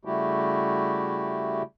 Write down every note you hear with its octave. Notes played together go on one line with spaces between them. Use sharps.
C#3 G3 A3 E4 F#4 G4